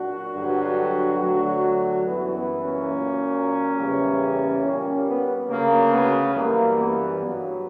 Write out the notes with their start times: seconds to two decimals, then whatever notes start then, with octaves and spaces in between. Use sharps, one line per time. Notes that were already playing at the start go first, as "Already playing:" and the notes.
Already playing: A#2 F#3 D4 F#4
0.34 G2 D3 F#3
1.20 D2 D3 F#3
2.06 F#2 E3 G3 B3
2.34 B3
2.63 A#3 C#4
2.92 A#2 F#3
3.78 E2 C#3 E3 G3
4.63 A#2 G3 A#3 C#4
5.07 B3
5.49 D2 C#3 F#3 A#3
5.92 B3
6.35 F#2 E3 G3 A#3
6.78 B3
7.21 G2 F#3 B3